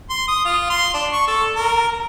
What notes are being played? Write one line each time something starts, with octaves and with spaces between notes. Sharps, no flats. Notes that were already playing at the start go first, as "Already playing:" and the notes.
C6
D#6
F4
C6
D4
C#6
A4
A#4